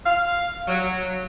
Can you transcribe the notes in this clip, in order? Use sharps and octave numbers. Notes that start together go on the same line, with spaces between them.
F5
F#3